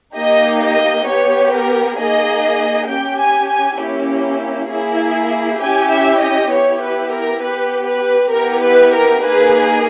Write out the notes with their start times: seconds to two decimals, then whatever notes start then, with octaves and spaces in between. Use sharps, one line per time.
0.16 A#3 D#4 G4 D#5
0.62 D#5
1.07 B3 G4 C#5
1.52 A#4
1.97 A#3 D#4 G#4 D#5
2.88 C#4 G4 G5
3.19 G#5
3.49 G#5
3.79 A#3 C#4 E4 G4
4.69 A#3 E4 G#4
5.60 C#4 E4 G4 G#5
5.91 E5
6.20 D#5
6.51 B3 E4 G4 C#5
6.81 B4
7.11 A#4
7.41 B3 G4 B4
7.87 B4
8.32 B3 E4 G4 A#4
8.62 B4
8.92 A#4
9.22 A#3 D#4 G#4 B4